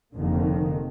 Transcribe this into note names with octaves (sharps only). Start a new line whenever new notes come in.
F1 F2 D3 D#3 A#3